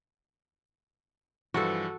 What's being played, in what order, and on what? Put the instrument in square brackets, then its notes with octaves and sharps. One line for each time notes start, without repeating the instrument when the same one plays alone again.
[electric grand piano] G2 E3 F3 [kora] F#4 A4